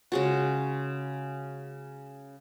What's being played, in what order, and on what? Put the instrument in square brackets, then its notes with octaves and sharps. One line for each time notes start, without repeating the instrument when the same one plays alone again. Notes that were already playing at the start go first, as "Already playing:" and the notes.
[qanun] C#3 G#3 F#4